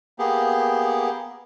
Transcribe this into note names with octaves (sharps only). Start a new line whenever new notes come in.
A#3 B3 G4 G#4